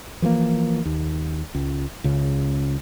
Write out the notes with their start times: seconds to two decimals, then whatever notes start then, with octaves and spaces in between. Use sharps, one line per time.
0.22 E3 F3 G#3 A#3
0.85 D#2
1.55 C#2
2.04 C#2 C#3